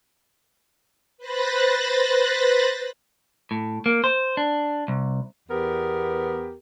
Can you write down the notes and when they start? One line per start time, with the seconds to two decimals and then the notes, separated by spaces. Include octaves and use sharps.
1.18 B4 C5 B5 F#6 A6 A#6
3.51 A2
3.86 A#3
4.04 C5
4.37 D4
4.88 C2
5.48 E2 B3 G4 A#4